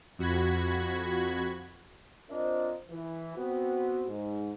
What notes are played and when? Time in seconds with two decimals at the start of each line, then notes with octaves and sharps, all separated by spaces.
0.19 F2 F#4 B5 G#6
2.30 C4 D4 F4 A#4 C5 D#5
2.89 E3
3.37 B3 C4 F#4
4.07 G#2